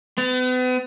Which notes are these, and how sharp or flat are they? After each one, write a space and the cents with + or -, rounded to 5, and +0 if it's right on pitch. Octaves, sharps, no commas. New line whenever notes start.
B3 +40